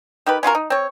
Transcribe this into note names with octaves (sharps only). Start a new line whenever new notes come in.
D#3 G4 B4
C#4 F4 F#4 A#4
D#4
C4 C#5